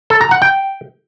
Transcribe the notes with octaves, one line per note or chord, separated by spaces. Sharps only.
A4
A#5
F#5
G5